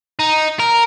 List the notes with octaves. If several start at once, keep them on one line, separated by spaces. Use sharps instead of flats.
D#4
A#4